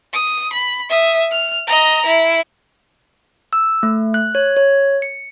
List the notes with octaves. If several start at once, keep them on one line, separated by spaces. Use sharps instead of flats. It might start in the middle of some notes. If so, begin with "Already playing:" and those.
D#6
B5
E5 D#6
F6
D#5 A#5
E4
E6
A3
F#6
C#5
C#5
C#7